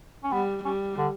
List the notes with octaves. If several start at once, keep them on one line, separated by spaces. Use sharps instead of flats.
C#4
G3 B3
G3 C#4
D3